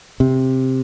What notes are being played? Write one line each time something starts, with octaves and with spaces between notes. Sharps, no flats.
C3